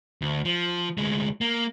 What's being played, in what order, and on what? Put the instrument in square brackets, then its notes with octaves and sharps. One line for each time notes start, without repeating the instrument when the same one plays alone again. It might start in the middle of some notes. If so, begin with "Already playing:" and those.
[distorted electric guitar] D2
F3
D2 G#3
A#3